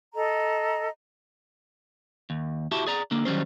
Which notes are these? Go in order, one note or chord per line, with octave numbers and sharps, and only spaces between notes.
A4 D#5 A#5
D#2
E4 F#4 G4 A5
G#4 D5 A#5
D3 A#3
D#3 F#3 G3 C#4 C5